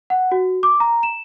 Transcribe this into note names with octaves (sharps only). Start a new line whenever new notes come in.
F#5
F#4
D6
A#5
E7